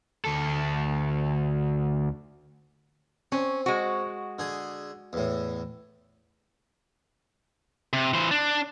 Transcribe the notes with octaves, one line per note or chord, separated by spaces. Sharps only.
D2 A4
C4 C#4
G#3 F#4
D3 G#4
E2 A2
C3
E3 C5
D4